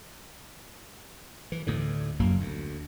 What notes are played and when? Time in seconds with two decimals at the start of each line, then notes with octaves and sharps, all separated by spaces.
1.52 E3
1.67 D2 A2 D3
2.20 F#1 F#2 F#3 A#3
2.39 D2